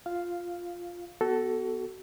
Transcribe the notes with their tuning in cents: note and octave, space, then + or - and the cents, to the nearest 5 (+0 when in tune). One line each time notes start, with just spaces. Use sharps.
F4 +0 F5 +0
B3 +0 F#4 +30 A4 +0